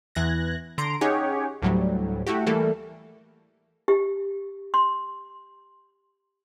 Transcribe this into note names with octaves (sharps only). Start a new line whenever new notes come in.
E2 E3 F#6 G#6 A#6
D3 A#5 C6 D7
C#4 D#4 G4 G#4 C#5 F#5
D2 A2 F#3 G3
A3 E4 F#4 G4
E3 G3 A3 A#3 A4
G4
C6